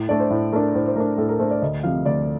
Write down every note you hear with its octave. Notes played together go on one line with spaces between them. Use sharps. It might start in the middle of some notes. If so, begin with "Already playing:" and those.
Already playing: A2
A3 D4 D5
C5
A2
A3 D4 A#4
A2 C5
C5
A3 D4 A#4
A2 A4
A#4
A3 D4 C5
D5
D2 D#5
C3 F3 F5
D2 D5